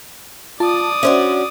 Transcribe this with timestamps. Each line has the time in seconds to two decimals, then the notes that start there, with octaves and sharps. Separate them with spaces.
0.60 F4 D5 A5 D#6
1.03 C#4 D4 F#4 C5 E5